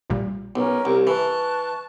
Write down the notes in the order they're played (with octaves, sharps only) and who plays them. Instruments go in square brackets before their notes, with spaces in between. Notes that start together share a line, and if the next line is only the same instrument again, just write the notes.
[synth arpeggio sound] A#1 A#2 G3
[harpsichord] B1 [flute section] C#4 A#4
[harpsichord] C2
[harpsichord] E3 [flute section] A5 C#6 F#6